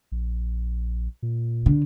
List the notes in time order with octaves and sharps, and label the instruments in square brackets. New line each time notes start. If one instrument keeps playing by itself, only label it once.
[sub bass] A#1
A#2
[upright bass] D3